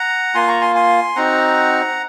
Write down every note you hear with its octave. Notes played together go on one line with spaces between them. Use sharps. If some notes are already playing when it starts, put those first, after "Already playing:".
Already playing: F#5 A#5
A#3 F4 G#5 C6
A#5 C#6
G#5 C6
G#5 C6
C4 D#4 F#4 F#5 A#5